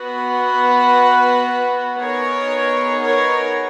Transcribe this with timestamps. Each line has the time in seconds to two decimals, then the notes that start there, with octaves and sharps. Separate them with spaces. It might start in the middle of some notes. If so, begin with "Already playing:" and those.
Already playing: B3 F#4 B4
2.00 B3 D#4 G#4 A#4 C#5
3.04 A#4 C#5